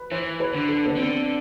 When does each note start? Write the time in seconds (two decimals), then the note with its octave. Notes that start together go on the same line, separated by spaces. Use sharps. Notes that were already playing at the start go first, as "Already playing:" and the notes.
Already playing: B4
0.11 E3 C5
0.40 B4
0.55 D3
0.69 A4
0.86 B3
0.97 D3 C4